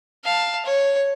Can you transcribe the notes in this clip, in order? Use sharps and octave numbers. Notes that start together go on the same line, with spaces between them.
F5 A5
C#5